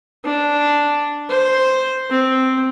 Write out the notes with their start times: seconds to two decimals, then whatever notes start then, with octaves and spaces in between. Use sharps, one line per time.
0.25 D4
1.29 C5
2.10 C4